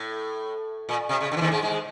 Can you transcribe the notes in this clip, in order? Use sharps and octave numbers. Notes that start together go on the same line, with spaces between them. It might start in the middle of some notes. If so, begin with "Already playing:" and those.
Already playing: A2
A#2
C3
C#3
D3
E3
D#2 D#3
G#2 G#3
G#2 G#3